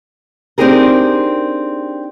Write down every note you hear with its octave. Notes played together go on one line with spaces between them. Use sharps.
C4 D4 D#4 G4 G#4 A#4